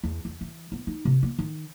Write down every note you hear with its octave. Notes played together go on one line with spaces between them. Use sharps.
E2
E2
E3
B3
D#4
C3
A#3
D#3